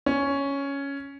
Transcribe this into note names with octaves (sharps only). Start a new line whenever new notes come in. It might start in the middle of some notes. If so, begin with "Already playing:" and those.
C#4